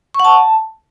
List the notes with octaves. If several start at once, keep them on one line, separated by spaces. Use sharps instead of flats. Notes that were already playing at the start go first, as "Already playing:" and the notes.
C#6
F#5
A5